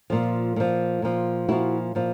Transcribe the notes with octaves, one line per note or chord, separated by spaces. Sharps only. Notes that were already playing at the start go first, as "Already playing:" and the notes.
A#2 F3
A#2 F3
A#2 F3
A#2 F3 E4 F#4
A#2 F3